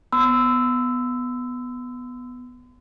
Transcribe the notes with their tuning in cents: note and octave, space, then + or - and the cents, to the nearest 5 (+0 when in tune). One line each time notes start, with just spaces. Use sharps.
B3 +0 C6 -45 E6 +0